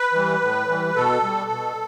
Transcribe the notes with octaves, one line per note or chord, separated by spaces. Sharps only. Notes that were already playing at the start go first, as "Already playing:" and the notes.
Already playing: B4
E3 G3
A2
E3 G3
B2 A4
G3
B2